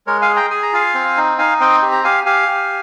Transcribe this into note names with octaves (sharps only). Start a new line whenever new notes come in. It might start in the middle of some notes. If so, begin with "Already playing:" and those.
G#3 A#4 C#5
F5 G#5
G#4
G5 A#5
G#4 G#5
A#5
F4 F5 G#5
C4
D#4
D#4 F5 G#5
C4 D#5 G5
G4
A#5
G4 F5 G#5
G4 F5 G#5
G4